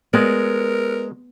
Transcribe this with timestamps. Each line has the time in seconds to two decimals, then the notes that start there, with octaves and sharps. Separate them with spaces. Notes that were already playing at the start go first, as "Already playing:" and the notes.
0.14 G#3 B3 A#4 D5